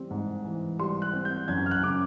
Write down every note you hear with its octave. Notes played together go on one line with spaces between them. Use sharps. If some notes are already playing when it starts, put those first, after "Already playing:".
Already playing: E3 G3 C4
G#2
E3
G3 C6
F#6
C4
G6
F#2 G#6
F6
F#6
C#3 D6